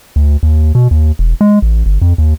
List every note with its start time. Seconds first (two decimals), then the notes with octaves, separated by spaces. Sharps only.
0.16 D2
0.43 D#2
0.75 B2
0.91 D#2
1.19 E1
1.41 G#3
1.62 A1
1.86 G1
2.02 F2
2.18 D#2